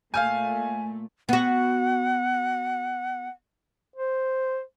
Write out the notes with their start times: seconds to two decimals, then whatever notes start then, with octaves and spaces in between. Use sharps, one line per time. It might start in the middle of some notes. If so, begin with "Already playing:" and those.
0.14 A#2 A3 F5 G#5 F6 G6
1.29 B3 F#4 F#5
3.96 C5